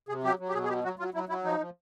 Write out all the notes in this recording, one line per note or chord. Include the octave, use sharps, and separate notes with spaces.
C3 G#4
F#3 G4
F#3
G4
B2 G#4
G#4
F#3 G4
F#3 F#4
F#3 F4
F#3 E4
F#3 E4
F3 D#4
F3